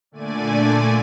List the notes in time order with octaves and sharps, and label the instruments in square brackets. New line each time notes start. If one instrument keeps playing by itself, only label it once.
[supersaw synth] A#2 D3 A3 D5 G#5 D#7